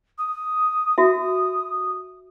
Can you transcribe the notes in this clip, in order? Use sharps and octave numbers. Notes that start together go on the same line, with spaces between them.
D#6
F#4 E5